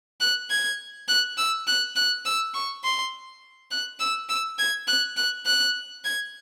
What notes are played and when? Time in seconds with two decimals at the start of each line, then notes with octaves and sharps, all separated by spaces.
0.20 F#6
0.50 G#6
1.08 F#6
1.37 E6
1.67 F#6
1.96 F#6
2.25 E6
2.54 C#6
2.84 C6
3.71 F#6
4.00 E6
4.29 E6
4.59 G#6
4.87 F#6
5.17 F#6
5.46 F#6
6.04 G#6